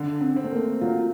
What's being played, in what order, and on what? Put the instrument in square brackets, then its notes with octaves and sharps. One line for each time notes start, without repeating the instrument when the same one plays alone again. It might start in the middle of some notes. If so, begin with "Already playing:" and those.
Already playing: [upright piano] D3
[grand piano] C4
[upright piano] C4
[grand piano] A3
A#3
[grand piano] F#3 [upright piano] F4